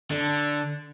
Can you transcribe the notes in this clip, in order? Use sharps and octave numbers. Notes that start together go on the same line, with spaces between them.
D3